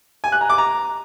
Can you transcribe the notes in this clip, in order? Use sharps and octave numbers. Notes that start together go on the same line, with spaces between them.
G#5
F#6
A#5
D6
A#5